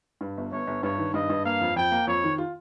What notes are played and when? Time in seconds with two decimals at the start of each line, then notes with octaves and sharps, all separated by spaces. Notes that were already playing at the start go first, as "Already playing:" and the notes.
0.21 G2
0.37 G1
0.52 G1 C#5
0.67 G1
0.83 G2 C#5
0.98 D#3
1.14 G2 D#5
1.30 G2
1.45 A#3 F5
1.61 F2
1.76 F2 G5
1.92 A#3
2.07 F2 C#5
2.24 D#3
2.38 F4